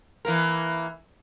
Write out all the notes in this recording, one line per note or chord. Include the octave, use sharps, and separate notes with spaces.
E3 A#3 A#4